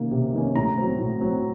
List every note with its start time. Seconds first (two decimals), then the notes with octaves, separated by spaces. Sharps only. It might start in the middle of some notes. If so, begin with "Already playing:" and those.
Already playing: C3 D#3 A#3 C#4
0.11 C3
0.33 D#3 A#3 C#4
0.56 A2 A#5
0.78 F#3 C4
0.99 A2
1.21 F#3 C4